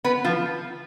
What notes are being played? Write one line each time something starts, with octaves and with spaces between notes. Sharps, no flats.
B3 B4
F3 F4